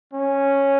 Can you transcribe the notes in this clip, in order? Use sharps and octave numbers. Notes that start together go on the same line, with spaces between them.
C#4